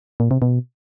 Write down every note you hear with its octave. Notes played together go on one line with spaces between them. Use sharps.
A#2
C3
B2